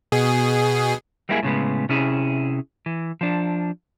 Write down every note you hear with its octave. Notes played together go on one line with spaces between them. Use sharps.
B2 G#4
G3 G#3 A#3 E4 G4 G#4
A2 C#3 G#3 B3
C3 C#4 E4 G#4
E3
F3 D4